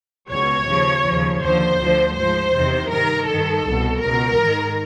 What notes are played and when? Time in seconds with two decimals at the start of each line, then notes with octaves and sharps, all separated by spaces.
0.30 C#2 B2 C#5
0.67 D#2 C#3 F3
1.04 D#2 C#3 F3
1.41 D#2 D3 F3 C5
1.79 D2 D3 F3
2.16 G#2 F3 C5
2.53 E2 C3 D#3
2.90 G2 D#3 A#4
3.27 G2 D#3 A4
3.64 C2 B2
4.02 C#2 B2 A#4
4.39 G#2 D#3